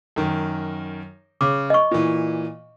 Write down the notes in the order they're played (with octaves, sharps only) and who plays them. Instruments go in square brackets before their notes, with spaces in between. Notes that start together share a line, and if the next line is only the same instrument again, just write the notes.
[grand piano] F#2 D#3
[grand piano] C#3 [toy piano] D6
[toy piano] D#5 C#6
[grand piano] A#2 E3